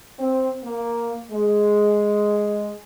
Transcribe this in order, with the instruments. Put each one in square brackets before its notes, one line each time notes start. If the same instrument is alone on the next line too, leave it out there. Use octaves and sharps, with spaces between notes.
[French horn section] C4
A#3
G#3